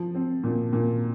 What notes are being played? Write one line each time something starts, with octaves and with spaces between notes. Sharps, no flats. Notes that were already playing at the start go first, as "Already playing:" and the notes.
Already playing: F3
C4
A#2
A#2